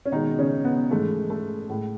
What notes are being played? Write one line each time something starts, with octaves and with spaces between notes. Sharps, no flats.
C#4
B2 D#3 G#3 D#4
C#3 C#4
B3
G#2 E3 G#3 A3
A3
A2 G#3